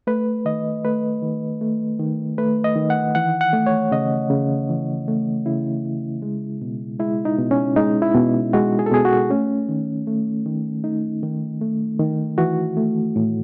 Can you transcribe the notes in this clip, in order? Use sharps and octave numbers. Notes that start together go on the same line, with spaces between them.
A3 B4
D#3 D#5
A3 B4
D#3
A3
D#3
A3 B4
D#5
D#3
F#5
E3 F#5
F#5
A3
C#5
C#3 D#5
C#3
E3
A3
C#3 E4
C#3
G#3
B2
G#3 E4
D#4
B2
C#4
G#3 D#4
E4
B2
G#3 F#4
G#4
A4
B2 G#4
F#4
A3 C#4
D#3
A3
D#3
A3 D#4
D#3
A3
D#3
E3 F#4
A3
A2